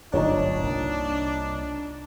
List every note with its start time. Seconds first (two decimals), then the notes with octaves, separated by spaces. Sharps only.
0.13 D1 G1 F#2 D4 D#4 F4 C#5
0.63 C2 A#3